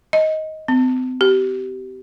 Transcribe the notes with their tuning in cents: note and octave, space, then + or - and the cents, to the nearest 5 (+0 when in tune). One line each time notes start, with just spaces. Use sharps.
D#5 +10
C4 -40
G4 -30